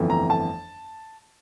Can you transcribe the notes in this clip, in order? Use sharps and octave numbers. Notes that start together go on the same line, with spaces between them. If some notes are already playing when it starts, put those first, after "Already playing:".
Already playing: G1 F2 E3 A3
A#5
A5